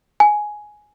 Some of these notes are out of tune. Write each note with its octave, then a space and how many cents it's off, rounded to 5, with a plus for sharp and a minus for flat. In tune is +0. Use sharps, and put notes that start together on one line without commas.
G#5 +10